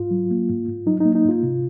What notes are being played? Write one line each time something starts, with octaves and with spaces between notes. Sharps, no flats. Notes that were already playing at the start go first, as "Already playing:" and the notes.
Already playing: G#2 F4
F#3
A#3
G#2
G#2
F#3 D#4
A#3 D#4
D#4
G#2 F4
C3